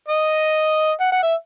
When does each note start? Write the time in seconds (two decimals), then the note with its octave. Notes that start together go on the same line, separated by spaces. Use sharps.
0.08 D#5
1.01 F#5
1.12 F#5
1.23 E5